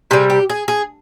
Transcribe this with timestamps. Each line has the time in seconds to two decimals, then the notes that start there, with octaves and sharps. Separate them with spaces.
0.11 C3 G3 G#4
0.30 G4
0.50 G#4
0.68 G#4